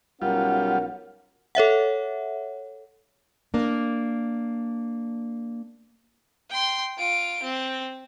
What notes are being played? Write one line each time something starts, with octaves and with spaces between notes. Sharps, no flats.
B1 G3 C#4 F4 A#4 F#5
A4 C#5 E5 F#5
A#3 D4
G5 C6
F4 D7
C4